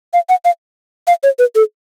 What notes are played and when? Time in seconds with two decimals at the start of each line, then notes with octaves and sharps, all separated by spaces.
0.13 F5
0.29 F#5
0.45 F5
1.07 F5
1.23 C#5
1.39 B4
1.55 A4